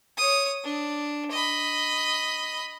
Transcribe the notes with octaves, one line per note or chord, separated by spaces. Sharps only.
C#5 D#6
D4
D#5 B5